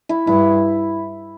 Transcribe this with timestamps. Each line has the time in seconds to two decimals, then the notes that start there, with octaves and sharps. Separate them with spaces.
0.09 E4
0.27 G2 E4